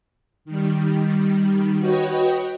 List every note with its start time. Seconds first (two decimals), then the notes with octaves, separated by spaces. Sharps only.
0.45 D#3 G3
1.79 F#4 B4 C#5 D#5 G5